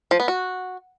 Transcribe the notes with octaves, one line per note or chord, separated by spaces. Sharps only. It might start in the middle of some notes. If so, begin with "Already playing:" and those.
F3
B3
F#4